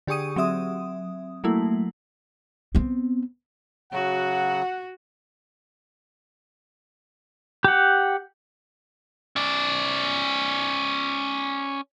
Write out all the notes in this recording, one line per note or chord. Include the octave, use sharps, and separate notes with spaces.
D3 G4 G#4 C#6 D#6 D#7
F#3 C4 E5 D#6
F#3 A3 A#3 E4
B3 C4
C#3 F#3 F#4 F#5
G4 F#5
C#4 D5